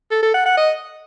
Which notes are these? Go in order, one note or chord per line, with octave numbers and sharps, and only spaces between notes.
A4
A4
F#5
F#5
D#5